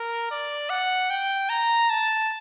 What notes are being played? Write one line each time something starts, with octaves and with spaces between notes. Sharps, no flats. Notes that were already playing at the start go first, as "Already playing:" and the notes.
Already playing: A#4
D5
F#5
G5
A#5
A5